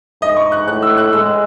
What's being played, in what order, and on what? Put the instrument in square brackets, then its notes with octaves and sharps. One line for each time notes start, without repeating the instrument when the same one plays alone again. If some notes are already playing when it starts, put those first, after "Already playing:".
[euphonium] G#2 [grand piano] D#5
[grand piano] C#6
F#6
[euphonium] A2 [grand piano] F#6
[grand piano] E6
F#6
[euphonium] G#3 [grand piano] E6